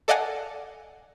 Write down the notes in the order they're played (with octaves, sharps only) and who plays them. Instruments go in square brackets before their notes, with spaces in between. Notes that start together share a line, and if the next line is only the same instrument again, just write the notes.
[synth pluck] A4 D5 D#5 F5 F#5 G#5